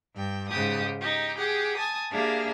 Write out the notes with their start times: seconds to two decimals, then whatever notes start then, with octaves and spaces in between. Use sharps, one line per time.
0.15 G2 G5
0.50 G#2 C#3 G4 D#6
1.01 D#4 G4
1.38 G4 G#4 F#5
1.77 G#5 A5 D#6
2.12 A#3 D4 G4 G#4 E5 F5